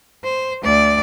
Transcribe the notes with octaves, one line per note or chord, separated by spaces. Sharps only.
C5
D2 D5